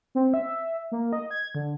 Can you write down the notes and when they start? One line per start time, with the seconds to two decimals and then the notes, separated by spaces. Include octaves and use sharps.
0.15 C4
0.34 E5
0.92 A#3
1.13 D#5
1.31 G#6
1.55 D3